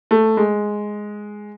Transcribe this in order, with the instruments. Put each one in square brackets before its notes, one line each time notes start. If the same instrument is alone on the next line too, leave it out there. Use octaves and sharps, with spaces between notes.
[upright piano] A3
G#3